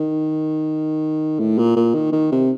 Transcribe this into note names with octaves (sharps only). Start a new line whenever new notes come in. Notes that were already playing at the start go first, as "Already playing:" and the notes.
Already playing: D#3
A2
A#2
A#2
D#3
D#3
C3